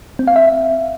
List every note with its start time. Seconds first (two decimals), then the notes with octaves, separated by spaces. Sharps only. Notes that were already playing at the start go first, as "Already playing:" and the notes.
0.19 C4
0.27 F5
0.36 E5